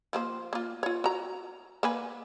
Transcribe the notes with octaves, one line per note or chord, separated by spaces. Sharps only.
F3 A#3 C5
A#3 F4
F4 C#5
F#4 A#5
A#3 B4 G#5